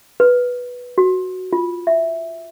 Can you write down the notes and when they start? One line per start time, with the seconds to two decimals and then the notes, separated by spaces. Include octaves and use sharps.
0.20 B4
0.98 F#4
1.53 F4
1.87 E5